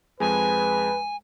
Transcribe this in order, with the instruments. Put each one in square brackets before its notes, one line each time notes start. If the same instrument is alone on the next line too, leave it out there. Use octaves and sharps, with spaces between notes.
[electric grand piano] F2 G#3 [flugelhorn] B4 [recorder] G#5